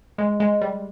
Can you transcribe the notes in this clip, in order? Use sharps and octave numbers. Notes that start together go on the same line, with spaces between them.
G#3
G#3
G3